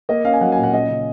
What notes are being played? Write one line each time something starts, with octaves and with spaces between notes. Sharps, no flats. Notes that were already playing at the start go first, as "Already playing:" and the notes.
A#3 D#5
C#4 F5
G#5
F#3 F#5
G#5
A#2
F#5
C#4 D#5
C#3